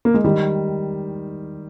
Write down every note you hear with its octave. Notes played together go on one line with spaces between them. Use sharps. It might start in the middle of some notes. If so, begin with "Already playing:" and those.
A#3
G#3
D#3 G3